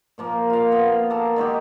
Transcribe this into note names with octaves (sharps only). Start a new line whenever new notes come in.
A#2 F3 A#3
F4 F5
B3
A#3 A4
D#3 G#3 F#4 G4